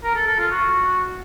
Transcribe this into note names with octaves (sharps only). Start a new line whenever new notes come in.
A#4
A4
A4
F4
F#4